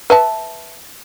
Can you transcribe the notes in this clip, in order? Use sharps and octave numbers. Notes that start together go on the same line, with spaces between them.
B4 E5 A5